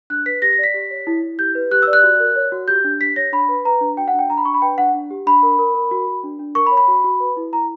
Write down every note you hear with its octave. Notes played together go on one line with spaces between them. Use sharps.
D4 F#6
B4 B6
G4 A#6
A#6
D5
B6
G4
C#5
E4
E4
G4 G6
B4
G4 F#6
E6
D5
F#6
F#4
A#4
C#5
F#4
G4 G6
D4
G4 B6
C#5 A#6
D4 B5
B4
B4 A#5
D4
F#4 G5
F#5
D4 G5
D4 A#5
B5
D4 C#6
B5
B4 G5
D4 F#5
D4
G4
D4 B5
A#4
A#4
A#4
F#4
F#4
D4
D4
A#4 C#6
B5
C#5
B5
F#4
F#4
B4
E4
E4 A#5